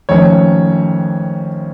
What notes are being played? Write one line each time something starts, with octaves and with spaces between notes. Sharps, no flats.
F2 D#3 A3 C#4 C#5